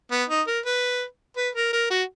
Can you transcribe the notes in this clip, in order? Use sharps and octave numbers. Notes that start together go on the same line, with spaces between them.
B3
D#4
A#4
B4
B4
A#4
A#4
F#4